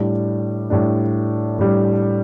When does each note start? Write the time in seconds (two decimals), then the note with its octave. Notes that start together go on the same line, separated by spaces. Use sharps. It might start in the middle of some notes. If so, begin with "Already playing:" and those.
Already playing: A2 G3 D4
0.70 A2 G3 D4
1.59 A2 G3 D4